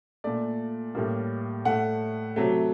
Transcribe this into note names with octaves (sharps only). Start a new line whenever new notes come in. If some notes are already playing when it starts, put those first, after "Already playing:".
A#2 A3 D5
A2 G3 A#3
A2 A3 F#5
C3 F#3 A3